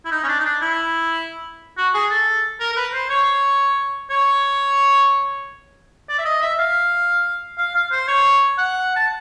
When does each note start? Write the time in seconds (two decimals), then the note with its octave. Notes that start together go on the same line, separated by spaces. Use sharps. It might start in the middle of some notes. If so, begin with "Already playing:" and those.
0.05 E4
0.11 D#4
0.23 C#4
0.28 D4
0.39 D#4
0.45 D4
0.61 E4
1.77 F#4
1.94 G#4
2.10 A4
2.60 A#4
2.72 A#4
2.76 B4
2.93 C5
3.10 C#5
4.10 C#5
6.09 D5
6.18 E5
6.25 D#5
6.42 E5
6.58 F5
7.58 F5
7.74 F5
7.91 C5
8.08 C#5
8.58 F#5
8.95 A5